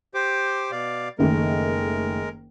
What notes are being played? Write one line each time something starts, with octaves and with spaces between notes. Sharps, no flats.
G4 C5 D6
B2 D5 F5
F#1 D#3 G#3 A3 A#4